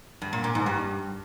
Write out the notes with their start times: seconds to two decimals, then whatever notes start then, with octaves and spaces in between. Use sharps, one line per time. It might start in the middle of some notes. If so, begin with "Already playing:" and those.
0.22 G2
0.33 A#2
0.44 A#2
0.55 G#2
0.66 G2